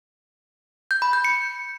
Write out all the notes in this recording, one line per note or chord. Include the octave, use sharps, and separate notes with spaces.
G6
B5
G6
C#7